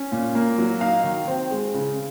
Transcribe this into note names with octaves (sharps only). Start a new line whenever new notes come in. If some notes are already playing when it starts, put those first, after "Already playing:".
Already playing: C#4
A#2
A#3
F#3
D#4 F5
D#3
C4
G#3
C#3